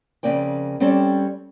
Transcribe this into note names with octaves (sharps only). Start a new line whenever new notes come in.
F2 C#3 A#3 D5 G5
G3 C4 C#4 G4 A4 D5